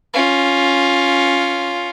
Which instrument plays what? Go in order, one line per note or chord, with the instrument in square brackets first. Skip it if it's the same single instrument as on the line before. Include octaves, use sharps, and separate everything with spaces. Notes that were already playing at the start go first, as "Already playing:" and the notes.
[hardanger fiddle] C#4 F4